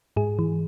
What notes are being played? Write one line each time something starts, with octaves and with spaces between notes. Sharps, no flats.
G#2 G#4
E3